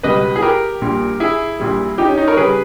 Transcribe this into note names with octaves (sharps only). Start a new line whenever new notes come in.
C#2 B2 G3 B4 D#5
G#4
G4 A#4
A#1 A#2 G3
E4 G#4
A#1 A#2 G3
D#4 G4
C#4
D#4
A#4 C#5
C#3 G3 G#4 B4